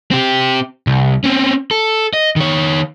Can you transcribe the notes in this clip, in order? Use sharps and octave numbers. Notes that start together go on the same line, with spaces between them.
C4 G4
C2
C4 C#4
A4
D#5
D#3 C#5